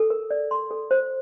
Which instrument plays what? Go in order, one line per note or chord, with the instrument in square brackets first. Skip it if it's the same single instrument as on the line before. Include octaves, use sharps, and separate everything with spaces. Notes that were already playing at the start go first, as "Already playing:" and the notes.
Already playing: [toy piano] A4
A#4
D5
C6
A4
C5